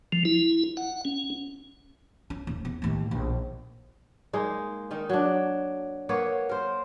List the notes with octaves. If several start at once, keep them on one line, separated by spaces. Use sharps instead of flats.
F3
E4
F#5
C#4
C#4
D#1
E2
D#2 A2
A#1
G#3 A#3 D#4
D#3 D#4
F#3 D4
A#3 B3 C#5
A#4 C5